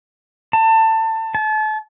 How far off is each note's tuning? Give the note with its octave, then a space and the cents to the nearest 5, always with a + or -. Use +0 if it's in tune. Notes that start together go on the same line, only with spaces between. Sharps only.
A5 +25
A5 -35